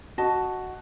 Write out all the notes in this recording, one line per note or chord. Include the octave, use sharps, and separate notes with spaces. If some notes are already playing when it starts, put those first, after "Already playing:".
F#4 D#5 A5